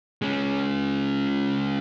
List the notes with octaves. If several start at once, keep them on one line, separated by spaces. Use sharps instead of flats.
G#3 C#4